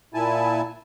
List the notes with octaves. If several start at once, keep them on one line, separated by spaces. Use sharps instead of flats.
A#2 E4 G#5 A5